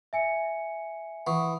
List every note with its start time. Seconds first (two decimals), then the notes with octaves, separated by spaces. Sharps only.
0.13 E5 G#5 C#7
1.27 E3 F#5 C#6 D#6